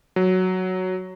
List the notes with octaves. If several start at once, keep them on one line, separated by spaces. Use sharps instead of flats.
F#3